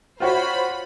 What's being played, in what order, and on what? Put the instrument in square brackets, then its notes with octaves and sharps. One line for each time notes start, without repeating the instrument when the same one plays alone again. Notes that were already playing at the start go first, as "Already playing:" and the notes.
[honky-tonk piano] F4 F#4 C#5 [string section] C5 B5